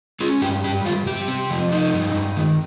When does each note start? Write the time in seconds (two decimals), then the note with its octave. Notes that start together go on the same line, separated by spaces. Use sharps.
0.20 C#4 F4 G#4
0.41 G2 G4
0.64 G3 G4
0.85 G2 F4
1.06 C3 G4
1.28 C4
1.50 F3
1.72 D#4
1.93 G2
2.15 G2
2.37 D#3